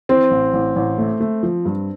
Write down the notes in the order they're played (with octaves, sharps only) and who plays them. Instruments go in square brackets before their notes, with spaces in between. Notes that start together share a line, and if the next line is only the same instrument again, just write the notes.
[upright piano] E3 [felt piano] C4
[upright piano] A1
A1
A1
A3
A3
F3
G2